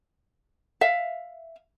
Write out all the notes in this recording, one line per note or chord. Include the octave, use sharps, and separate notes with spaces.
E5 F5